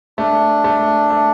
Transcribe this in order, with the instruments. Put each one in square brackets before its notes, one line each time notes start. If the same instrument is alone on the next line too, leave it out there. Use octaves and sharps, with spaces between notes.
[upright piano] A3 [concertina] D4
[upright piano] A3
A3